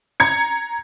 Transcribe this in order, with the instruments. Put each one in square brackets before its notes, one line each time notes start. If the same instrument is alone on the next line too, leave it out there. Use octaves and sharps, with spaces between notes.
[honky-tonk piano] A#5 G#6 C#7